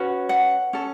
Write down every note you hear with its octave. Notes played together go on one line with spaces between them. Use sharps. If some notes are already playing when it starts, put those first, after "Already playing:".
Already playing: C#4 F#4 B4
F#5
C#4 A4